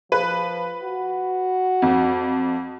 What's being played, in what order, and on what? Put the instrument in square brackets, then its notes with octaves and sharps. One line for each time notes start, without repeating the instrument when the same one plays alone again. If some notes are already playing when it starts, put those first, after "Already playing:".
[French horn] F3 [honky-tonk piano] B4
[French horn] F#4
[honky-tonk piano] F2